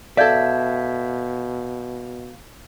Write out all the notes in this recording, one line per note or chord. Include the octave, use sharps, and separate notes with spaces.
B2 A4 D5 E5 F5 G6 G#6